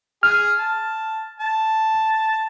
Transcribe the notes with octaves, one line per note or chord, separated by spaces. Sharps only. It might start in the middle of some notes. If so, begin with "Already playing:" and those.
G#4 F6
A5
A5